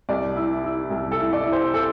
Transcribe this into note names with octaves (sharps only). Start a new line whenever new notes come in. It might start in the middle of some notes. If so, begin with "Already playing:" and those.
C2 D5
E4
E4
C2
A4
E4
D5
E4
C5
A4